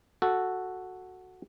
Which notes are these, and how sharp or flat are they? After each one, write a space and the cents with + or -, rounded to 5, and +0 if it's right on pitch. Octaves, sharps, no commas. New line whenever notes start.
F#4 +0 A4 +0